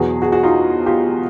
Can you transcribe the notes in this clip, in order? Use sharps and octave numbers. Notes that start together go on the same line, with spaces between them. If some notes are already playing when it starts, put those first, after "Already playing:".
Already playing: E2 B2 F#3 B3 F#4 G#4
F#4 G#4
F#4 G#4
D#4 F4
F4 G4